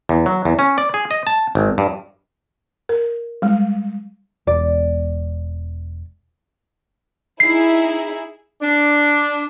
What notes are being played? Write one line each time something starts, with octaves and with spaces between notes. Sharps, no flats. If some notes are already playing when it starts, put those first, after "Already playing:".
E2
F#3
E2
C#4
D5
G#4
D#5
A5
G#1
G2
A#4
G3 G#3
E1 D5
D#4 E4 G#4 C7
D4